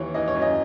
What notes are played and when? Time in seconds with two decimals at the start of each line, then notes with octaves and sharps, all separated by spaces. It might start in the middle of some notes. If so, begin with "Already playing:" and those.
Already playing: D#2 E3 C#5
0.14 E3 D#5
0.28 C#5
0.35 F#2
0.42 D#5